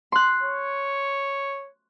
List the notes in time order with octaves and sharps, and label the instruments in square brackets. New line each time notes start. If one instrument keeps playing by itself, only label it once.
[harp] C6 F#6
[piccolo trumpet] C#5